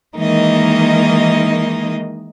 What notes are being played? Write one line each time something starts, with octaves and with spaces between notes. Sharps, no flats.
D#3 E3 G#3 A#3 D#4 D#5